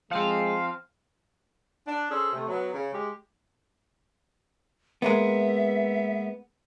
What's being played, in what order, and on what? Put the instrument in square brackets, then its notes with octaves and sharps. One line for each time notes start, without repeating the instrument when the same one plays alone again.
[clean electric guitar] F3 C4 [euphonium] G#3 [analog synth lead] F5
[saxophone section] D4
C#4 G#4 A4 C5
C3 A3
F#3 B3
C#3
G#3 G4
[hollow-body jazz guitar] G#3 A#3 B3 [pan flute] E5